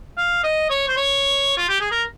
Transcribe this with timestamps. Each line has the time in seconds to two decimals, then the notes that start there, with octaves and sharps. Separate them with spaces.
0.17 F5
0.43 D#5
0.70 C#5
0.88 C5
0.97 C#5
1.57 F4
1.69 G4
1.81 G#4
1.92 A#4